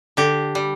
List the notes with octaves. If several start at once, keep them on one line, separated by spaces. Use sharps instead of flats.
D3 G4
G3